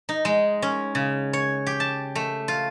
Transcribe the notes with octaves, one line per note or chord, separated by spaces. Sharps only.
D#4
G#3
C#4
C#3
C#5
G4
A5
A3
F4